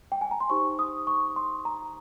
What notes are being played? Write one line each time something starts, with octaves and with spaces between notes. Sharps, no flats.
G5
G#5
A#5
C6
D#4 G4 C5 C#6
D#6
C#6
C6
A#5